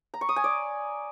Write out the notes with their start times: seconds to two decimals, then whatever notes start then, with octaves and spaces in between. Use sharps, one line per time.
0.14 A#5
0.21 C#6
0.29 D#6
0.36 G#5
0.44 D5